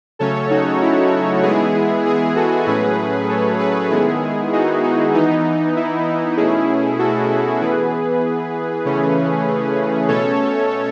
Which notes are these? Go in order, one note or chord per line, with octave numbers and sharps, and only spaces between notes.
C#3 F#3 A3 C#4 A4 C#5
D#4 F#4
E4
E3 G#3 B3 E4 G#4
E4 G#4
F#4 A4
A2 F#3 A3 C#4 G#4 B4
A4 C#5
G#4 B4
D#3 G#3 B3 E4 G#4
D#4 F#4
D#4 F#4
E3 B3 D#4
E4
B2 A3 C#4 E4 G#4
F#4 A4
E3 B3 G#4 B4
C#3 E3 A3 C#4
B2 A3 C#4 A4 C#5